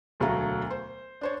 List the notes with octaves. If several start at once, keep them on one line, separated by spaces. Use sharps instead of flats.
E1 D2 F#3 A3 F5 A#5
C5
D4 C5 C#5